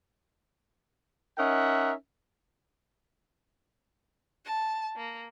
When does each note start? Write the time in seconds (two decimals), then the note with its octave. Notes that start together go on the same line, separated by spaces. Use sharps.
1.38 C#4 D#4 A#4 E5 F#5
4.46 A5
4.96 A#3